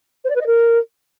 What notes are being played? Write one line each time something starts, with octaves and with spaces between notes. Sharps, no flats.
C5
D5
B4
D#5
A#4